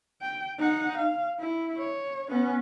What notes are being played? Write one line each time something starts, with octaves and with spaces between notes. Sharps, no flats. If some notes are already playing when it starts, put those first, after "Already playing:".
G5
D#4 F#5
F5
E4
C#5
B3 C#4